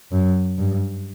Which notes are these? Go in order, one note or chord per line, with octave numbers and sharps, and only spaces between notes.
F#2
G2